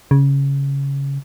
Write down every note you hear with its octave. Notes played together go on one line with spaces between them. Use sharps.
C#3